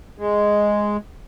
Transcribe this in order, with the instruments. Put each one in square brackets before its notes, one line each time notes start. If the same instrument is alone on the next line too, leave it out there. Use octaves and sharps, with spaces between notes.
[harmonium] G#3